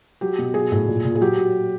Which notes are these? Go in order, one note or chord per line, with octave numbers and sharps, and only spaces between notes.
F#3 G4
B2
F#3 G#4
A2
A#2
A#2
G#4
F#3 G4
F#3